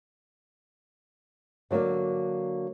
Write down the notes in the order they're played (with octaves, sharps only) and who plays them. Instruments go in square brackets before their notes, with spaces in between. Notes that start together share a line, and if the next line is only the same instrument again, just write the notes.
[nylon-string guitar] D3 F#3 A3 A#3 D5